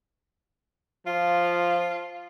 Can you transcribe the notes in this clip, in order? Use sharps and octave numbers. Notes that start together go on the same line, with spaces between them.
F3 F4